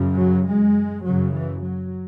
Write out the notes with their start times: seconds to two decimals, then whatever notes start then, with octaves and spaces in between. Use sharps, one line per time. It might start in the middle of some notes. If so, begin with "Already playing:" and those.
Already playing: F#2 C#3
0.18 F#3
0.47 G#3
1.05 F#2 C#3 F#3
1.35 E3
1.64 F#3